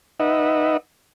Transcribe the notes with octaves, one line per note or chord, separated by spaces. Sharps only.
D#4 B4 D#5 E5 F#5